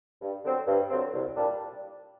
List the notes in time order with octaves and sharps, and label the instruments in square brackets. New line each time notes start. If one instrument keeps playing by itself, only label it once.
[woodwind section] G2
D3 F#3 C4
G2
D3 F#3 C4
C2
A#2 G3 D4